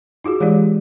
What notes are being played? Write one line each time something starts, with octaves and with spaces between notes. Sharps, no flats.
D#4 F4 F#4 G#4
E3 G#3 F4 G4 D5